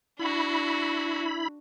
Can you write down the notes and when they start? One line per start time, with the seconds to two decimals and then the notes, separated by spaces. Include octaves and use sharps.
0.19 D4 E4 F#4 B5